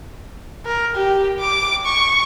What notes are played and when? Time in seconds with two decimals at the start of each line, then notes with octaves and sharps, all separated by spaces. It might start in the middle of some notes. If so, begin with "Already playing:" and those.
0.66 A#4
0.96 G4
1.39 D6
1.86 C#6